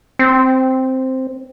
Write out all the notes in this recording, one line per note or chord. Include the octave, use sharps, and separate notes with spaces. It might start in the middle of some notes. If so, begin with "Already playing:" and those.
C4